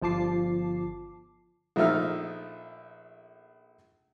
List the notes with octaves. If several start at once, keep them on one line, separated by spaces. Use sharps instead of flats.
G1 F3 F4 A5 D6 C7
A#1 F3 A3 D#4 E5 F6